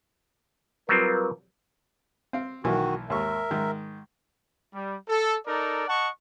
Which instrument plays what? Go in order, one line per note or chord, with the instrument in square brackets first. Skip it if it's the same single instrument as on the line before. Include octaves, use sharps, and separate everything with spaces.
[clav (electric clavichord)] F#3 G3 C4 [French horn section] F4 A#4 B4
[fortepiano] C4 F5
[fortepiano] B1 E3 A#3 [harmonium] D#3 F#4
[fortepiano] D#2 G#2 C#6 [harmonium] A#4 E5
[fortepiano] G#2 D#3
[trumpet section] G3
A4
D#4 A4 A#4 D5
D#5 F#5 A5 C#6